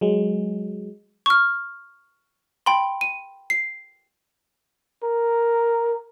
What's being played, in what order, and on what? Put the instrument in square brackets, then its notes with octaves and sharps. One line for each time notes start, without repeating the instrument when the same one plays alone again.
[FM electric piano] F#3 G#3
[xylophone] C#6 F6
G5 B5 C6
D#7
C7
[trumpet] A#4